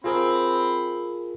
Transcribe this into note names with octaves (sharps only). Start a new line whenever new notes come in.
C4 F4 G#4 A#4 B5